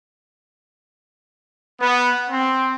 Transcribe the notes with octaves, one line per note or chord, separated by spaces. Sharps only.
B3
C4